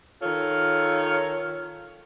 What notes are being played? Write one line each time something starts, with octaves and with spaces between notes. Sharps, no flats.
D#3 F4 A4 C#5